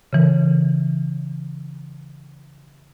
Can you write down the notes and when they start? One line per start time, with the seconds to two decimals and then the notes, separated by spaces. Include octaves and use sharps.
0.13 C#3 E3